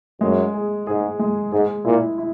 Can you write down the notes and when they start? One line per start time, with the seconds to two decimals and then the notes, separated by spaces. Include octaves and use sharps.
0.21 F#2 G#3
0.54 G#4
0.87 G#2 G#4
1.19 G#3
1.52 G#2 G#4
1.85 A#2 E4
2.18 E4